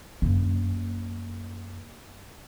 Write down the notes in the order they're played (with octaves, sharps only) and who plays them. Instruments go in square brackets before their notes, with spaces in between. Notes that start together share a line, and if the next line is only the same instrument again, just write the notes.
[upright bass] F#2 A#3